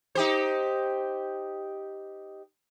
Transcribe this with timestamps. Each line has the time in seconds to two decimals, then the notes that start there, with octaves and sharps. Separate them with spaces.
0.15 D#4 G4 C5